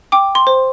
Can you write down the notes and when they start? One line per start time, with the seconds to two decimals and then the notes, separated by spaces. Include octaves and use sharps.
0.12 G5 D6
0.35 C6
0.47 C5